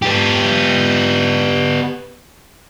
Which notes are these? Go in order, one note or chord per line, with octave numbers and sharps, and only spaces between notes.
B3 G4